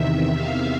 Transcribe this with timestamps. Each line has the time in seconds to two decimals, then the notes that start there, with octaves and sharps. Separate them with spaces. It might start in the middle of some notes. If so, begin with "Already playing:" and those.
Already playing: E2 C3 D#3 E5
0.35 F5